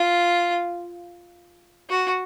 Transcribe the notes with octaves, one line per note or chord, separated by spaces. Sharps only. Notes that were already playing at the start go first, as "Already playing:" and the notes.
Already playing: F4
F#4